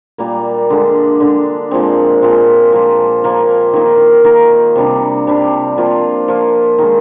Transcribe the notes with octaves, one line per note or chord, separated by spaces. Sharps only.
A#2 G3 A#3
D3 G#3 D4
D3 G#3 D4
A#2 F3 G#3 C4
A#2 F3 G#3 C4
F3 A#3 F4
F3 A#3 F4
D#3 A#3 D#4
D#3 A#3 D#4
C3 G3 D4
C3 G3 D4
F3 A#3 F4
F3 A#3 F4
D#3 G#3 D#4